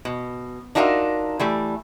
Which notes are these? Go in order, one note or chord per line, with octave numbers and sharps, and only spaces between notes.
B2
D4 D#4 F4 F#4 A#4 E5
E3 G3 A3